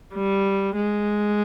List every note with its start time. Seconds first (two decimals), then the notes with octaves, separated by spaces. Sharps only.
0.14 G3
0.76 G#3